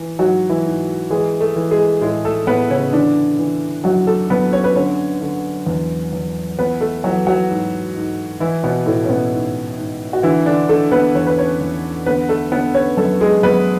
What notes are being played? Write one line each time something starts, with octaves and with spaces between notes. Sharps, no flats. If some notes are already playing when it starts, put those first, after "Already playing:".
Already playing: E3
G#2 F#3 F#4
E3 E4
G#2
E3 G#3 G#4
A3 A4
E3
G#3 G#4
A2 G#3 G#4
A3 A4
A2 B3 B4
C#3 C#4
D3 E3 D4
E3
F#2 F#3 F#4
A3 A4
F#2 B3 B4
C#4 C#5
B4
D3 C#4 C#5
D3
E2
E2
E3 B3 B4
A3 A4
E3 F#3 F#4
F#3 F#4
G#2
G#2
E3 E4
B2 B3
A2 E3 A3
C#4
B2 B3
G#2
G#2
F#4
D3 E3 E4
D3 D4
D3 A3 A4
B3 B4
E2 C#5
B4
C#4 C#5
E2
D3 B3 B4
A3 A4
D3 B3 B4
C#4 C#5
F#2 A3 A4
G#3 G#4
F#2 B3 B4